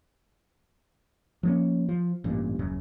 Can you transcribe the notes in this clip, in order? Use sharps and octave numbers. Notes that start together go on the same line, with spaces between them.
F3 A#3 C#4
F3
A1 G2 A#2
D#1 F#2 C#3